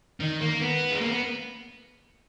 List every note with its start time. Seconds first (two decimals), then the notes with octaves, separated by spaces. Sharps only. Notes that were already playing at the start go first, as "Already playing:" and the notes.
0.20 D#3
0.41 A#3
0.61 B3
0.91 G#3
1.01 A#3
1.11 B3